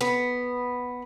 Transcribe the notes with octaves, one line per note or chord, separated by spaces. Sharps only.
B3